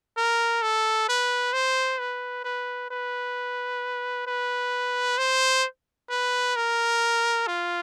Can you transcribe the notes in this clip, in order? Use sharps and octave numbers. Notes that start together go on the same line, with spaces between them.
A#4
A4
B4
C5
B4
B4
B4
B4
C5
B4
A#4
F4